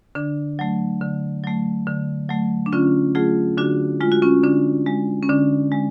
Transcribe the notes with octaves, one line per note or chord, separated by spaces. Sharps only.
D3 D4
F#3 A3
D3
F#3 A3
D3
F#3 A3
D4
D3 C#4 F4
F#3 A3 F4 G#4
D3 D4 F#4
G#3 F4
F#4
C#4 F4
D3 D4
G#3
C#4
D3 D4
G#3